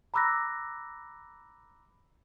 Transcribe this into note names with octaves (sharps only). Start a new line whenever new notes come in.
A#5 B5 D6 E6 F#6 A#6